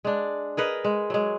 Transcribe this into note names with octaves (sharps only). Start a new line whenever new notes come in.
G#3 D4
G#4 A#4 B4 D#5
G#3
F#3 G#3